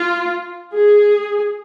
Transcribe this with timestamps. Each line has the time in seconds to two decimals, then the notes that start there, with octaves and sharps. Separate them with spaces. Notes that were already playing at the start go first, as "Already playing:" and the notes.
Already playing: F4
0.74 G#4